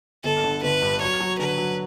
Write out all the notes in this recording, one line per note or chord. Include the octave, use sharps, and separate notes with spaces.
G1 A4
D3
G1 B4
G2
F#3 C#5
F#3
D3 B4
F#3